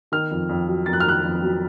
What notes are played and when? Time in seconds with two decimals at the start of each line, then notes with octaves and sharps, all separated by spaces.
0.12 D#3 F6
0.31 F2
0.49 F2
0.68 F#3
0.86 F2 A6
0.93 F#6
1.00 F6
1.05 D#3 F#6
1.24 F2
1.43 F#3